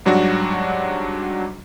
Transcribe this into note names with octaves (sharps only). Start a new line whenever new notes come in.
G#2 F#3 G3 D4 F#4